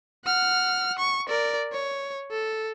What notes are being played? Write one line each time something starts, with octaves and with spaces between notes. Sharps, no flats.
F#5 F6
C#6
A#4 D5
C#5
A4